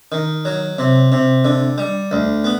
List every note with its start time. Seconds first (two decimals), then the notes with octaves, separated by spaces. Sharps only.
0.12 D#3
0.45 F#3
0.78 C3
1.12 C3
1.45 D3
1.78 G3
2.11 D2
2.44 B3